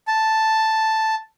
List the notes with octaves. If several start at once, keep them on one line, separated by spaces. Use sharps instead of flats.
A5